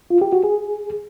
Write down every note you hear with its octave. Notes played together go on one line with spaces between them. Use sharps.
F4
G4
F#4
G#4